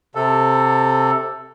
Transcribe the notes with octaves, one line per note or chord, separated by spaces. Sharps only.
C3 A4